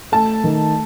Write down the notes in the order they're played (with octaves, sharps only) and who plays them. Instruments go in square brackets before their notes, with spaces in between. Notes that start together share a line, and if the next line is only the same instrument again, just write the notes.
[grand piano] A3 [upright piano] A5
[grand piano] D#3